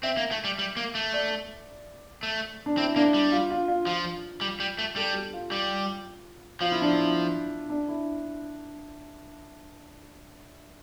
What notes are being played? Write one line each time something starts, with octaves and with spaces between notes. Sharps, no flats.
C4 E5
A#3
A3
G3
G3
A#3
A3
D5
A3
D4
C4 E4
A#3 D4
G3
F4
F4
F4
F3 F4
G3
G3
A3
G3 A4
G4
F4
G3
F3 F4
E4
D4
E4
D4
E4